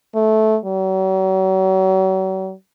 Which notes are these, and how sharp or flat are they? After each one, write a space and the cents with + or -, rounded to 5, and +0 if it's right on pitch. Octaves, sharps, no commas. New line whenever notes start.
A3 -15
F#3 +40